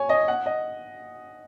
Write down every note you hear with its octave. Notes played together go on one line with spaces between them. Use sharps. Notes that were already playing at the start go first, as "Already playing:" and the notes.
Already playing: C#5 G#5
D#5
F#5
D#5